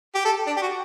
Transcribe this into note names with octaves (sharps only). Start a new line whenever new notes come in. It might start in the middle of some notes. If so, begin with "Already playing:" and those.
G4
A4
D4
G4
F#4